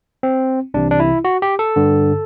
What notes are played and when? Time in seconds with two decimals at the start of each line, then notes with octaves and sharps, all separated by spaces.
0.23 C4
0.74 C2 C3 E3 D4
0.91 D4
1.00 E4
1.25 F#4
1.42 G4
1.59 A4
1.76 G2 D3